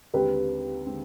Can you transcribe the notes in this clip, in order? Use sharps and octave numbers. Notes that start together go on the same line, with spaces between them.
D#2 D3 G#3 C4 G4 B4
D3 G#3 C4